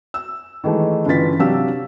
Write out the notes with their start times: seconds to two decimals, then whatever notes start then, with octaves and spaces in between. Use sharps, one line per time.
0.14 E6
0.64 D#3 E3 G#3 A3
1.06 G1 C#3 E3 F4 A6 B6
1.39 C3 F#3 D4 G4 F5 E6